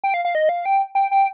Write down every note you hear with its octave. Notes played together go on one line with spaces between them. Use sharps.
G5
F5
F5
D#5
F5
G5
G5
G5